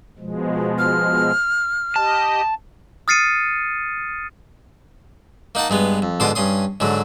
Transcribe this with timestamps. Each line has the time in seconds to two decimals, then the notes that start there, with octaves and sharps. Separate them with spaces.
0.19 B2 F3 G#3
0.78 F6
1.96 G4 D#5 A5
3.08 D#6 F6 A6 C7 C#7 D#7
5.55 A#3 D#4 F#5 A5
5.70 G2 G#3 B3
6.02 F2
6.20 G#2 B2 D3 C6 D6 D#6
6.35 G2 C#4 C6 D#6
6.80 G#2 D3 F#3